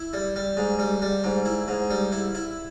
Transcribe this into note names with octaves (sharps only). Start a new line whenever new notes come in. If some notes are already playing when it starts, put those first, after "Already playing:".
Already playing: E4
G3
G3
G#2
G3
G3
G#2
E4
G#2
G3
E4
E4